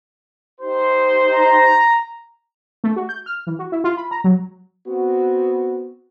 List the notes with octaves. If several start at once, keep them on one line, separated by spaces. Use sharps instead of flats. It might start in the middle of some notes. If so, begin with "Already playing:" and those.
D#4 G4 C5
A#5
A3
F#4
G6
F6
E3
F#4
E4
F4
B5
A#5
F#3
B3 C4 F#4